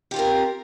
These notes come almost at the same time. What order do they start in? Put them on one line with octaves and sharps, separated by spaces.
G4 F4 C4 A#4